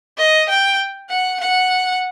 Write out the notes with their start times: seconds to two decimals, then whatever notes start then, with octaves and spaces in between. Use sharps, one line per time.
0.18 D#5
0.48 G5
1.09 F#5
1.40 F#5